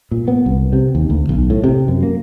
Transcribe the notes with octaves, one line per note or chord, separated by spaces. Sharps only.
A#2
B3
C2
C3
D#2
D2
B1
A2
C3
F#2
A#3